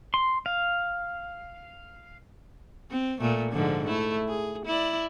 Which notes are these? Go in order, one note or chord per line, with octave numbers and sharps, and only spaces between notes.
C6
F5
C4
A#2 A3
G#2 D3 F3
A3 E4
G#4
E4 D5